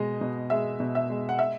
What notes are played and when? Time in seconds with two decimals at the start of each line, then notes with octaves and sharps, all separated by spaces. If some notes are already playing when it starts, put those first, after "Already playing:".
Already playing: B2 G#3 D#5
0.21 B2
0.50 G#3 E5
0.80 B2
0.95 E5
1.10 G#3
1.29 F#5
1.39 E5